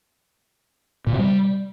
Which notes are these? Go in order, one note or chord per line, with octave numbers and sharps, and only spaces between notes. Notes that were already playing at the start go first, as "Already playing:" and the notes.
A#2
C3
G3